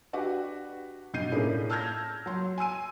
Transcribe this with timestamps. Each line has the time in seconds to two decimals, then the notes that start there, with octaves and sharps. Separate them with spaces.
0.13 D4 F#4 G4 B4
1.13 G2 B2 D#4 G6 C7 D#7
1.31 A2 A#3 C#4 D4 E4 G#4
1.70 A5 E6 F6 G6 G#6 A#6
2.26 F#3 C6
2.58 G#5 C6 E6 D#7